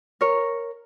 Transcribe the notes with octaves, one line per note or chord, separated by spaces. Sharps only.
A#4 C#5